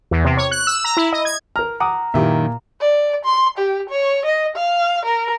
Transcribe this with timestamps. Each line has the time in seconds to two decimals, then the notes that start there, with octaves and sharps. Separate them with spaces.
0.11 E2
0.25 C3
0.37 C#5
0.51 F#6
0.67 E6
0.84 A#5
0.97 E4
1.12 D#5
1.25 G#6
1.56 A#4 A#5 F6
1.80 F#5 A#5 D6 D#6
2.14 F#2 A#2 D#3 E4 G4 E5
2.81 D5
3.25 C6
3.58 G4
3.90 C#5
4.25 D#5
4.56 F5
5.05 A#4